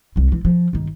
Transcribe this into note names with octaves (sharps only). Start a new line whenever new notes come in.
C2 G3
E3
F3
G1 D#3